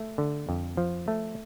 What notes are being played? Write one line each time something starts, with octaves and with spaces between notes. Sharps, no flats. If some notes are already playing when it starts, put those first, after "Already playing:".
Already playing: A3
D3
F2
F3
A3